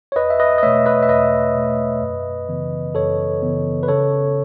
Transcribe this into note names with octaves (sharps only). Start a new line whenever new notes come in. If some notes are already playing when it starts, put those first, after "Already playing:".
C#5
E2 B4 D#5
E5
B4 D#5
D#5
B2 A3 C#5 E5
B4 D#5
E5
E2 B4 D#5
B2 A3
F#2
C#3 E3 B3
F#2 A4 C#5
C#3 E3 B3
B4
C#3 A4 C#5